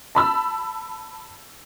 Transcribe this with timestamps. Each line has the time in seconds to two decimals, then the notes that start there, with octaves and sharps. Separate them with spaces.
0.15 A5 B5 E6